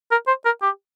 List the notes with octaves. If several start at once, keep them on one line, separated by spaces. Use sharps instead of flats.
A#4
C5
A#4
G4